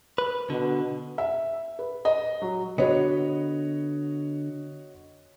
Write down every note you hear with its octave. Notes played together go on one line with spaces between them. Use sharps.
B4
B2 D3
E5
B4
D#5
F#3
D3 B3 F#4 C#5 D#5